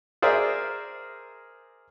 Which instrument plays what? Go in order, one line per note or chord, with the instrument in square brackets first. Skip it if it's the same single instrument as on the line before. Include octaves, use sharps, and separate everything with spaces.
[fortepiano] G#4 A#4 C5 D5 E5